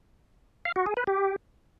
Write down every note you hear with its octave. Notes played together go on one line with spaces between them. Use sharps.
F5
F#4
G#4
B4
G4